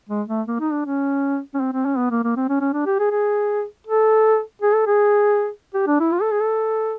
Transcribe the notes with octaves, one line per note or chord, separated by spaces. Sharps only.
G#3
A3
A#3
D#4
D4
C#4
C#4
C4
C4
C#4
B3
A#3
A#3
C4
C#4
C#4
D4
G4
G#4
G#4
A4
G#4
A4
G#4
G4
D4
E4
F4
A4
G#4
A4